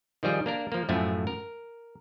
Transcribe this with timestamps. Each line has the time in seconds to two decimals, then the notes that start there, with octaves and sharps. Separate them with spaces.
0.23 D#3 F3 G3 G#4
0.46 A#3 D4 A#4
0.72 F3 A#3
0.89 F#2 A2 F3 A3 G#5
1.27 A#4